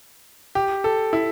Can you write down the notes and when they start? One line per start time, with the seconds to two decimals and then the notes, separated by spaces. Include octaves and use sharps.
0.55 G4
0.84 A4
1.13 E4